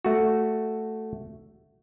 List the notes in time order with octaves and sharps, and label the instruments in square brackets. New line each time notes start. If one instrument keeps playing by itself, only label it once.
[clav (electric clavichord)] A3 F#4